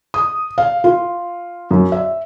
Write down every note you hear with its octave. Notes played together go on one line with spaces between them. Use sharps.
D#6
F5
F4
F#2
E5